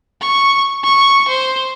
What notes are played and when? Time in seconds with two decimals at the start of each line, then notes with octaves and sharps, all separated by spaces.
0.22 C#6
0.84 C#6
1.29 C5